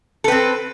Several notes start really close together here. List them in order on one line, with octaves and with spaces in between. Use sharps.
A4 B4 C4